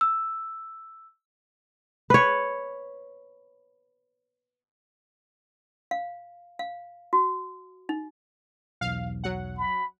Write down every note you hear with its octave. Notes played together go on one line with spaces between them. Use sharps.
E6
B4 C#5
F5
F5
F#4
D#4
B1 E2 F5
F#3 F#5
B5